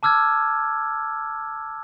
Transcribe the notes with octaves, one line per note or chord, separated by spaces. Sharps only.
A5 D6 E6 F6 G#6